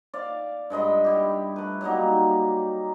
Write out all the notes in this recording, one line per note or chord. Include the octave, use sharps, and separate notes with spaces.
D5 F5
G2 G#3 D#5 B5
E4 G4
A3 B4
F#3 G3 A#3 D#4